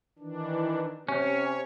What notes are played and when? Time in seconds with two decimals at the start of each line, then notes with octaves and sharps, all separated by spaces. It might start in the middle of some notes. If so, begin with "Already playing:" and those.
0.19 D#3 E3 D4
1.09 C3 C#4 C#5